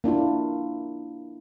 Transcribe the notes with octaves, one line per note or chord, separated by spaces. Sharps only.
A#3 D4 E4 F4